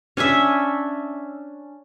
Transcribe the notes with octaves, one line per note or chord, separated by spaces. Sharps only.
C#4 D4 C#5 E5